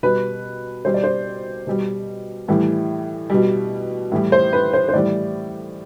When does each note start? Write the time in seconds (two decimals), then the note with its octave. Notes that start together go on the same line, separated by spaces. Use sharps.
0.03 B2 G3 B4
0.85 B2 G3 C5
0.94 D5
1.04 C5
1.67 B2 G3
2.48 A2 E3 G3
3.30 B2 G3
4.12 A2 E3 G3
4.32 C5
4.53 B4
4.73 C5
4.89 C5
4.93 A2 E3 G3 D5